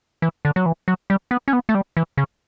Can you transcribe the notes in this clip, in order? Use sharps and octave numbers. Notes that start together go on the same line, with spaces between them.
E3
D3
F#3
E3
F#3
G3
B3
C#4
B3
A3
G3
E3
C#3